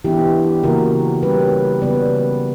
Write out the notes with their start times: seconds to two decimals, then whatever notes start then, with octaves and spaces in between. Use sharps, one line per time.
0.05 E3 B3 D4 E4 G4
0.64 C#3 E3 A#3 F#4 A#4
1.22 C#3 G3 C#4 G4 B4
1.82 C#3 F#3 B3 B4 D5